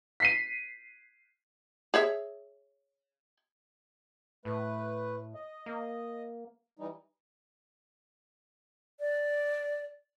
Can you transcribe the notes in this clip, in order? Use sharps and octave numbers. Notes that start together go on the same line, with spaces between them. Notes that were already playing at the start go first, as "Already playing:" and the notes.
B6 C7 D#7
G#4 C#5 E5
A2 A3 B4
D#5
A#3
E3 G3 D#4
D5